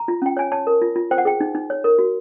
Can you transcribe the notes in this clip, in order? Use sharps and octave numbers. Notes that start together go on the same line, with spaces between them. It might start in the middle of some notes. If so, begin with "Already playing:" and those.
Already playing: A#5
F4
C#4 G5
C#5 G#5
C#5 A5
A#4
F4
F4
C5 G5
F#5
G#4 G5
D#4
D#4
C#5
A#4
F#4